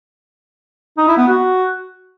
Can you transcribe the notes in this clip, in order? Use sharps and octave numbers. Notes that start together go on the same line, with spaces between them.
D#4
E4
B3
F#4